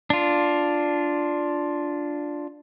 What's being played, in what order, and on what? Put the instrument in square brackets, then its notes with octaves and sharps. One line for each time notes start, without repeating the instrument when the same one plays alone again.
[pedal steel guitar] D4 F4